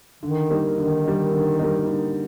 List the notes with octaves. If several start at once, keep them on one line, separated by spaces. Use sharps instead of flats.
D3 D#3
G3 A#3 D#4
D3 D#3
G3 A#3 D#4
D3
G3 A#3 D#4
D3